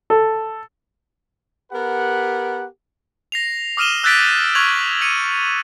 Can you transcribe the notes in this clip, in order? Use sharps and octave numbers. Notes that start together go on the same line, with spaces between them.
A4
B3 G4 A#4 B4 F#5
A#6 C7 F7
D6 D#6 F6 D#7 E7 G7
E6 F#6 G6 A6 B6 D7
C#6 F6 F#6 G#6 F7 F#7
G#6 C#7 D#7